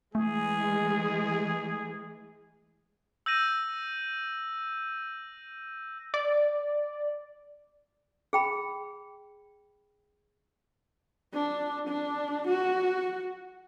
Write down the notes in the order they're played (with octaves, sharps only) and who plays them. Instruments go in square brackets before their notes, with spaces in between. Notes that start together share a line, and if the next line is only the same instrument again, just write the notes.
[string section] E3 G#3 [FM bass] A3 [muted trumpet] G#4
[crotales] E6 G6 A#6 D#7
[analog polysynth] D5
[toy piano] G#4 G5 B5
[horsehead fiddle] D4
D4
F#4